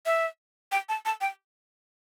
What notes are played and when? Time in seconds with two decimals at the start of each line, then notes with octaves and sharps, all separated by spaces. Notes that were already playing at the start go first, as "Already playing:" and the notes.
0.06 E5
0.72 G5
0.89 A5
1.05 A5
1.21 G5